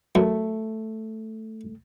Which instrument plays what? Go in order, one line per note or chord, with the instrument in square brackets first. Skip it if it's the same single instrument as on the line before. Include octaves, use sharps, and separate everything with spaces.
[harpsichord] F#2 [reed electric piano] A3